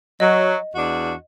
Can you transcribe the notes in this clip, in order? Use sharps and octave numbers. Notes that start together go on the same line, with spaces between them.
F#3 D#5
E2 D4 F#4